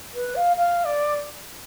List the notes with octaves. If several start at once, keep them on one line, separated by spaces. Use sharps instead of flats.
B4
F5
F5
D5